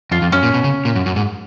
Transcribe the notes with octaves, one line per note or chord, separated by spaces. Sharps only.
F2 F4
F2
F#2 C#4
A#2
B2
C#3
A#2
F#2
F#2
G#2